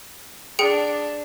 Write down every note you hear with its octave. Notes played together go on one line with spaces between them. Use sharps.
D4 G#4 G5 C#7